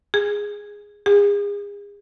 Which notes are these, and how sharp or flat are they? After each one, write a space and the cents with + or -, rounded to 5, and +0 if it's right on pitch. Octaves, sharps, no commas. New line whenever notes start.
G#4 -10
G#4 -35